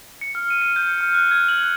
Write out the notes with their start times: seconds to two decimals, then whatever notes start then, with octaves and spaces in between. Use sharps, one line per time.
0.21 C#7
0.35 F6
0.50 D#7
0.62 C#7
0.76 G6
1.01 F6
1.15 F#6
1.31 G#6
1.49 F#7
1.63 F#6